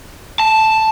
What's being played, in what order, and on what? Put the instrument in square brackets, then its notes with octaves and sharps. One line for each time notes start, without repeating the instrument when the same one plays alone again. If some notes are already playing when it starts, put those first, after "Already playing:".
[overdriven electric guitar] A5